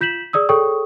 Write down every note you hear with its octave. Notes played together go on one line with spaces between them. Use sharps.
F4 G6 B6 E7 F#7
G#4 D5 D#6 E6
G#4 A4 C#5 G5 C#6 D#6